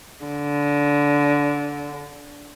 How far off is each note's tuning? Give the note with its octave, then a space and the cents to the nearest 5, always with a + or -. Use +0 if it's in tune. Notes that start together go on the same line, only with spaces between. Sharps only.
D3 -20